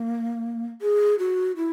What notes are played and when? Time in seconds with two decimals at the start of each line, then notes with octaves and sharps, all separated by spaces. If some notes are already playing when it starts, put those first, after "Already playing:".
Already playing: A#3
0.82 G#4
1.19 F#4
1.56 E4